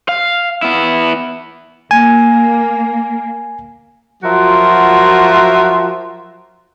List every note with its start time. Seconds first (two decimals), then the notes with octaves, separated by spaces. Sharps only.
0.09 F5
0.62 B3 E4
1.91 A#3 G#5
4.23 F3 F#3 F4 F#4 A#4 E5